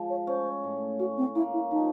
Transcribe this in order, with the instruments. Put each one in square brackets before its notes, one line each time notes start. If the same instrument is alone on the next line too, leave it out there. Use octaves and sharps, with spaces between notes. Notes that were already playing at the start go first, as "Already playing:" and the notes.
Already playing: [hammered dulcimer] F3 G#3
[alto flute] C#5
[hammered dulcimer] C#4 [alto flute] C5
[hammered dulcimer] A2
[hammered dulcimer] C#4 [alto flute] F#4
[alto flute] C4
[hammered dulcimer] A#3 [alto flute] E4
[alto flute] E4
[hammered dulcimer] F3 [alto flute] D#4